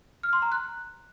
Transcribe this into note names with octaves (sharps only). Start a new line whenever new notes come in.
F6
C6
A#5
F#6